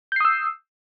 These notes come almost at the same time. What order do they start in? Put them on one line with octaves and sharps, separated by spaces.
G6 C7 D#6 E6